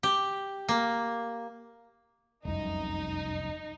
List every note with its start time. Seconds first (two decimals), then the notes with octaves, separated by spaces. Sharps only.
0.03 G4
0.69 A#3
2.45 F1 C2 F#2 D#4